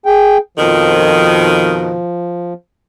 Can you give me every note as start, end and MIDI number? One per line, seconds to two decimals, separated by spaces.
0.06 0.38 68
0.06 0.38 79
0.58 2.00 41
0.58 2.00 47
0.58 2.00 51
0.58 2.53 53